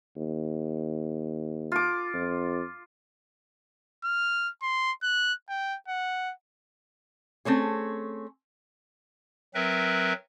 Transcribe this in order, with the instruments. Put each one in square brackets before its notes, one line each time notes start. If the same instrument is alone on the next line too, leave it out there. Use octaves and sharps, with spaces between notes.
[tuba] D#2
[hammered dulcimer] F4 D6
[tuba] F2
[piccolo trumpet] F6
C6
F#6
G5
F#5
[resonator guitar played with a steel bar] A3 C4 C#4 G#4
[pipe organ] F#3 C4 A#4 B4 E5